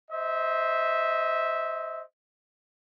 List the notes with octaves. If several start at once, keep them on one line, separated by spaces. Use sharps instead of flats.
C5 D#5 E5